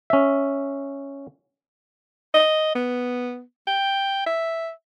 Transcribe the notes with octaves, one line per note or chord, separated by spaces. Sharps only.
C#4 E5
D#5
B3
G5
E5